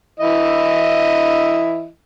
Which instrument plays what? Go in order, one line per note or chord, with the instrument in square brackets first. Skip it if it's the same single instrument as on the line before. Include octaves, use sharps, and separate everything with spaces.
[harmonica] E3 E4 D#5